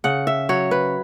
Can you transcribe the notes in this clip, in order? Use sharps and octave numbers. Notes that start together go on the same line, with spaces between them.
C#3 F#5
E5
F#3 C#5
B4